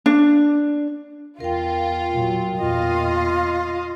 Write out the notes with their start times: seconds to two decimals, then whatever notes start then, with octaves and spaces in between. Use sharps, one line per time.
0.06 D4
1.40 E2 F4 A#4 G5
2.11 A#2 F#3
2.58 E2 A#2 F4 D#5 F5